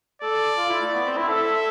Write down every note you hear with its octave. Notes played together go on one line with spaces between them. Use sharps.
A4 D5
F4
E4
A3
B3
C4
E4
A4 E5